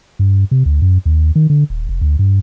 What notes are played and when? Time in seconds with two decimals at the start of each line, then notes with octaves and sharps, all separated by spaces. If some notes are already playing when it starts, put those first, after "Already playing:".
0.19 G2
0.51 C3
0.66 D2
0.82 F#2
1.06 D#2
1.35 D#3
1.50 D3
1.70 D#1
1.89 F1
2.01 D2
2.19 G2